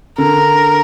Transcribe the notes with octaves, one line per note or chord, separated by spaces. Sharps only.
D3 A#4